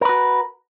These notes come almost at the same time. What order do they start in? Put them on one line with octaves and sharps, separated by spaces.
A#4 B4 F#4